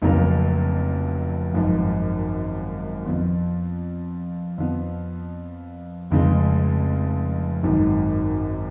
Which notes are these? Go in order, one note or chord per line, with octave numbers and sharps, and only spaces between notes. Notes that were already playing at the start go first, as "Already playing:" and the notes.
F1 F2 C#3 F#3 A#3
G#1 F#2 F3
F2 F3 B3 F4
F2 F3 B3
F1 F2 C#3 G#3
G#1 F#2 D#3